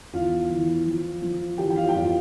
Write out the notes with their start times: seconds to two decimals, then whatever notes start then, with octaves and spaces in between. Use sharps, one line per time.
0.13 E2 F4 F5
0.50 E3
0.86 F3
1.22 F3
1.58 E3 G4 G5
1.70 G5
1.76 F4 F5
1.89 G5
1.94 F2 F4 F5